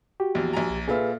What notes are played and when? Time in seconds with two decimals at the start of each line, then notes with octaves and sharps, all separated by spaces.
0.20 F#4 G4
0.35 A#1 E2
0.53 A#1 G#5 A#5
0.70 B1
0.88 A#2 F4 G#4 A4 B4 E5